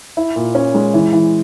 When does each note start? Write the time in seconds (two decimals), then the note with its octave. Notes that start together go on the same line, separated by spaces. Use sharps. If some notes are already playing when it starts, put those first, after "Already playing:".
0.17 E4
0.36 A#2
0.55 C#4
0.74 G#3
0.94 E3
1.13 E3